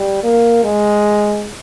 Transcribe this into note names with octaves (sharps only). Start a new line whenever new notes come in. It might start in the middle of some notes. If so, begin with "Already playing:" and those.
Already playing: G3
A#3
G#3